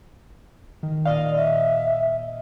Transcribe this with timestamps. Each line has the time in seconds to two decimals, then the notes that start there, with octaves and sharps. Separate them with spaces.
0.83 D#3
1.05 A#2 D5 D#5 F5
1.37 E5